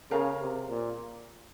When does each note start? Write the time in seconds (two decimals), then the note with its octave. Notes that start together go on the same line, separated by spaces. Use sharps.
0.11 C#3 A#4 F5 A#5
0.41 C3
0.70 A#2